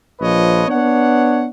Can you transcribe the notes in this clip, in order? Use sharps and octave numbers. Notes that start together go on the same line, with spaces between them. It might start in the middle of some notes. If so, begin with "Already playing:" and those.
A#1 F3 B4 C#5 D#5
B3 D4 C#5 F#5